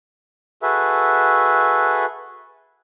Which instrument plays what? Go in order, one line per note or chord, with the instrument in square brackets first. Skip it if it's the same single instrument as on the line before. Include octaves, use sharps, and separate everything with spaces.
[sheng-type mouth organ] F#4 G#4 A4 B4 E5